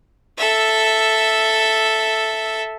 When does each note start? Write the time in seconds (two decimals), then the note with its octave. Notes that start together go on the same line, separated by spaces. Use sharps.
0.38 A4 E5